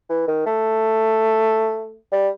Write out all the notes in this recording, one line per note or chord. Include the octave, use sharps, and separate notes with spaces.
E3
D#3
A3
G3